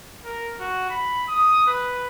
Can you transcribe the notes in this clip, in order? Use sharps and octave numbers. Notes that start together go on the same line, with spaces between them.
A#4
F#4
B5
D#6
B4